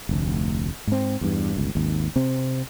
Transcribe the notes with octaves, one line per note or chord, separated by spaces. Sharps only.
F1 D2
G#2 C4
E2 G2
G1 C#2
G#1 D#2
C3 C4